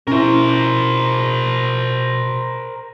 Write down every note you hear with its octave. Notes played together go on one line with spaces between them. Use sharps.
B2 C#4 E4 A#4 C5